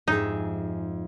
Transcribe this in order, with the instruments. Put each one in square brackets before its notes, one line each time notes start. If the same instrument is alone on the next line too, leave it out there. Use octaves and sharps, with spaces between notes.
[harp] F2 G#2 E5 [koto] D#4 [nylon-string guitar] G4 G#4